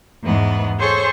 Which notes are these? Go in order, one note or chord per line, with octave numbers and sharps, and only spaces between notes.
E2 G#2 B3
G#4 A4 C5 C#5 C#6